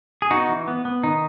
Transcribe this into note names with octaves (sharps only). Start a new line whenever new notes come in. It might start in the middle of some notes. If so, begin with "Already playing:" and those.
G#4
B3 D#4 F#4
E3
B3
B3
D#3 D#4